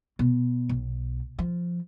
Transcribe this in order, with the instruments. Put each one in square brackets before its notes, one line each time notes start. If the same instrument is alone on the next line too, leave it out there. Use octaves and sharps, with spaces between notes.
[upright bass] B2
B1
F3